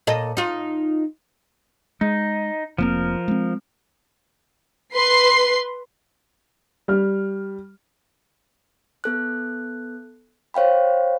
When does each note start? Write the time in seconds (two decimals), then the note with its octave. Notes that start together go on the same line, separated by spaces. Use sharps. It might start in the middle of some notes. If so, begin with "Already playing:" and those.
0.07 A#2 A4 D#5
0.37 D#4 F4
2.01 G#3 D#4
2.78 F1 F3 A#3 C4 A#4
3.28 G#3 C4
4.93 B4 C6 C7
6.88 G3 F6
9.04 B3 A4 F#6
10.54 C5 C#5 F5 G5 B5